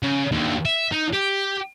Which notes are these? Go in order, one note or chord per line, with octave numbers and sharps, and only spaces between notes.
C#3
D#2 D3
E5
D#4
G4